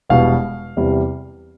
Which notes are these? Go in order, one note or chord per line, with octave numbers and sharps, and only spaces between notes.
E1 E2 B2 G3 F5
E2 C3 G3